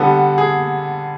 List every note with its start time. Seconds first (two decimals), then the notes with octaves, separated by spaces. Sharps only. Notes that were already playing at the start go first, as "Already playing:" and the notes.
Already playing: D3 G3 B3 A4
0.38 G#4